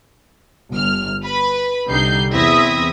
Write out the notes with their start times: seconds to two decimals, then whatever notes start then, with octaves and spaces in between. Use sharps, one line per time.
0.72 G1 F6
1.24 B4 B5
1.88 C2 D3 G3 D#4 G6 C7
2.32 E2 C4 E4 E5 D#6 A#6